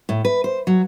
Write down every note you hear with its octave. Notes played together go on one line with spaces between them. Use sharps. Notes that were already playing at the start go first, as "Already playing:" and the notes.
A2
B4
C5
F#3